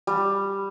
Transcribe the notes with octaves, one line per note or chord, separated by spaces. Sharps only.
G3